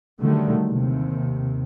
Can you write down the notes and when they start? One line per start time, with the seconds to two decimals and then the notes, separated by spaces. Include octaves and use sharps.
0.20 D3 D#3 F#3 G3 A3
0.63 D#2 C3